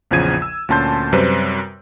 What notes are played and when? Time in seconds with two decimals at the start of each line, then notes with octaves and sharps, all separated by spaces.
0.11 A#1 E2 C#3 F3 G#6 D#7
0.42 E6
0.69 D2 A#2 C#4 A5 C6 G6
1.13 F#2 C3 G3 B4 C5